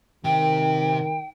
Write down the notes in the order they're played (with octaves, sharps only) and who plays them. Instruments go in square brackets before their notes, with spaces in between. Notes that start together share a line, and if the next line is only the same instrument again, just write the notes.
[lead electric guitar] C3 G4 [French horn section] D#3 [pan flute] G5